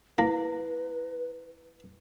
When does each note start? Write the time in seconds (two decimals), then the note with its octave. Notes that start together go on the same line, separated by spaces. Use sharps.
0.18 A#3 E4 B4